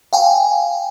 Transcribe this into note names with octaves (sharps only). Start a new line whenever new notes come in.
F5 G5 G#5